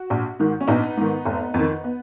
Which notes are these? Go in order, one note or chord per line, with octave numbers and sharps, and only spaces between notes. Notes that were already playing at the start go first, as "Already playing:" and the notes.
Already playing: F#4
A#1
G#2 D#3
C#4
A#1 B3 D#4
G#2 D#3
F1
F2 D#3
B3